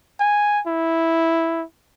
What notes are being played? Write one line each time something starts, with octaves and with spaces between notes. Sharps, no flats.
G#5
E4